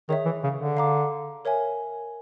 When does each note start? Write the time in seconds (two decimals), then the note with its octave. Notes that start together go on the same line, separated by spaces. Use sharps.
0.09 D#3 G#4 C#5 E5
0.25 E3
0.43 C#3
0.60 D3
0.77 F5 A#5 D6
1.45 A#4 C#5 E5 G#5